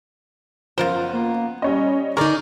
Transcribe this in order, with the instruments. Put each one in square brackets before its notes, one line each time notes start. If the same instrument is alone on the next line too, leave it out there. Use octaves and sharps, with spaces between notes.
[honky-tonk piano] F#1 F3 [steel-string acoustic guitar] B3 [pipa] F4 A#4 C5
[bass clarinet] A#3
[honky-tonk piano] G3 C#5 D#5 [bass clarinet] C#4
[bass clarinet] D3 [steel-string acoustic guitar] D#4 G#4 [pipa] A#4 D5 [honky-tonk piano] C#6